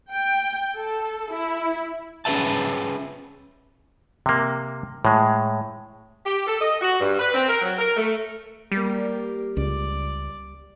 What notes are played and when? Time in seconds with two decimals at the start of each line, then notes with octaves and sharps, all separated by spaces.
0.11 G5
0.75 A4
1.32 E4
2.25 C#4 G#4 B4 E5 A5
4.26 C3 A#3
5.05 A2 G#3
6.26 G4
6.47 A4
6.62 D#5
6.82 F#4
7.00 G2
7.20 B4
7.34 C4
7.48 A#4
7.62 F#3
7.79 A#4
7.97 A3
8.72 G3 A#3 G4
9.57 C#2 D5